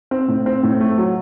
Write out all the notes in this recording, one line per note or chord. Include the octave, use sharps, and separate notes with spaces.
C4
A2
C4
A2
A3
F#3